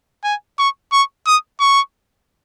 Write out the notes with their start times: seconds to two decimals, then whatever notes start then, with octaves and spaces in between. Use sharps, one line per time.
0.24 G#5
0.58 C#6
0.92 C#6
1.27 D#6
1.60 C#6